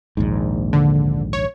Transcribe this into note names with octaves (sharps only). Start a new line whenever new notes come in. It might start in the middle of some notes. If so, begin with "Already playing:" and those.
A#1 D#2 G#2
D3
C#5